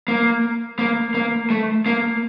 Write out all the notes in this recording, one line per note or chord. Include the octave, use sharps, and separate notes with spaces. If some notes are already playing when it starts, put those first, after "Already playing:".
A#3
A#3
A#3
A3
A#3